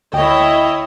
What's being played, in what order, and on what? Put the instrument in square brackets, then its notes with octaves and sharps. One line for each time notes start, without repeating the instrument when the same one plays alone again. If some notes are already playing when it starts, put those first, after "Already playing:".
[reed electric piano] D2 G5 [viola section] E4 C#5 D#5